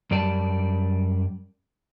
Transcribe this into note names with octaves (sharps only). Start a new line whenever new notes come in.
F#2 G3 D5 G#5 A5